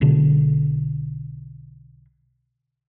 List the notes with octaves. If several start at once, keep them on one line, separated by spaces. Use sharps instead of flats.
B1 B2 D3